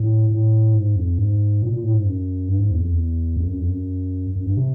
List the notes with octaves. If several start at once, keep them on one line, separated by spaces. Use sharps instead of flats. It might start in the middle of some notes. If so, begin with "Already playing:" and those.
Already playing: A2
A2
G#2
F2
G#2
A#2
A#2
A2
G#2
F#2
G2
G#2
E2
F2
E2
F2
F#2
F2
F#2
F#2
G2
C3